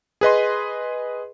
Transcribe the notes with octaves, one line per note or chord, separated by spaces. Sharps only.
G#4 B4 D#5 C6